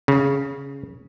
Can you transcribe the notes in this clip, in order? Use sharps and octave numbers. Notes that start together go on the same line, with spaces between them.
C#3